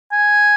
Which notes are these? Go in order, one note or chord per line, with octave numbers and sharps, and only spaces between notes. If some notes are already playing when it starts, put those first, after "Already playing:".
G#5